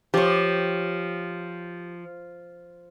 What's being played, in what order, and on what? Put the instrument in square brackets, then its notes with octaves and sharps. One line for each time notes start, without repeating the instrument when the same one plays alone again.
[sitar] F3 [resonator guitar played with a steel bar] G4 C#5